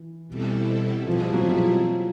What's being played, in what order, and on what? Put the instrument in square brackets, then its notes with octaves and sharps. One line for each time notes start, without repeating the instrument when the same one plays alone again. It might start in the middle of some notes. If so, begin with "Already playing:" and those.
Already playing: [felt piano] E3
[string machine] B2 G3 C4 E4 A4
[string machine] B2 G3 C4 E4 G#4 [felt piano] F3
[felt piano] F3
F#3
F3
F#3